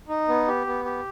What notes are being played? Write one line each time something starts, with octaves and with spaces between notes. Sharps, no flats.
D#4
B3
G4
B3
G4